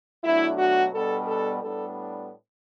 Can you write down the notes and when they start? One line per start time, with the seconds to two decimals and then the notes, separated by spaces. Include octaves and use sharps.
0.22 B2 F#3 A3 D4 E4
0.57 F#4
0.92 B2 G3 B3 D4 A4
1.27 A4
1.61 A2 G3 B3 D4 A4